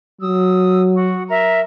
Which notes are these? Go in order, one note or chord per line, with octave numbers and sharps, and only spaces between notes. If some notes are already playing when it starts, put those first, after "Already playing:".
F#3 D#6 E6
F#4
A#4 E5 A#5